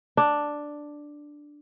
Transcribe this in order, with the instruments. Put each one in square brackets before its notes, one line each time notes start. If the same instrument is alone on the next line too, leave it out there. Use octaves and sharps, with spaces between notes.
[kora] D4